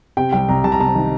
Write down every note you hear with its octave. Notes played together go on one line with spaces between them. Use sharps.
C3 G5
C2 G5
C2 A#5
C2 A5
A#5
C3 A5
D#3